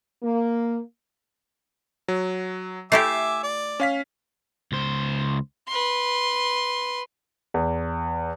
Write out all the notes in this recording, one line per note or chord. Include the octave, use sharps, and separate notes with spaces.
A#3
F#3
A3 E4 G4 E5 G#5 D6 C7
D5
C#4 F5 B6
C#2 C5
B4 C6
E2